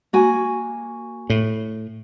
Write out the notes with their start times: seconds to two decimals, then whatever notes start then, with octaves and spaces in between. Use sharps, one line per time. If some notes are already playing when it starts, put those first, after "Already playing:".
0.13 A#3 F#4 G#5
1.30 A2